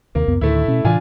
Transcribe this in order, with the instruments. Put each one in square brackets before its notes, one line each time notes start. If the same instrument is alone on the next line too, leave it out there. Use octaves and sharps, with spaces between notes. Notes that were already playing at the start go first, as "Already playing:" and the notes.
[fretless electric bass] D#2 C3 [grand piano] A#3
[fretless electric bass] C#2 F#2 B3
[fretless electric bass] D2 A2 D#3 [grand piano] A3 E4
[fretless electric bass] B2 C#4
[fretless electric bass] A2 C3 E3 [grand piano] D4 F4 G#5